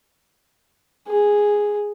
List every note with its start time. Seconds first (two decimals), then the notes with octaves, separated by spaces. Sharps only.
1.08 G#4